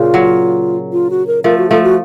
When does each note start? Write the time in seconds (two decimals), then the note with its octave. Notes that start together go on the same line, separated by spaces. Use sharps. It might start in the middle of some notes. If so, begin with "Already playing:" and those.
Already playing: A#2 C#3 F4
0.14 F#3
0.92 F4
1.10 F#4
1.27 A#4
1.44 F3 A3 A#4
1.58 F#4
1.70 F3 A3 A4
1.83 F#4